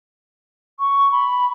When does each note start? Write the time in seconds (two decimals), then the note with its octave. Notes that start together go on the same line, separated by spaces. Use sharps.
0.79 C#6
1.12 B5